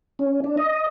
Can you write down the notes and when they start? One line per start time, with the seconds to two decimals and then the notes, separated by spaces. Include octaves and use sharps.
0.19 C#4
0.44 D4
0.57 D#5